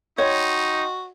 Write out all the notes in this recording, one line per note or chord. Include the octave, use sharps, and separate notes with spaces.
D#4 F#4 C#5 D#5 G5 C6